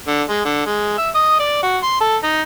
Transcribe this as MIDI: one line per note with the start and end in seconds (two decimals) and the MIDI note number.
0.07 0.22 50
0.29 0.41 56
0.45 0.65 50
0.66 0.95 56
0.98 1.09 76
1.15 1.37 75
1.39 1.61 74
1.63 1.78 66
1.83 1.98 84
2.01 2.16 69
2.23 2.41 63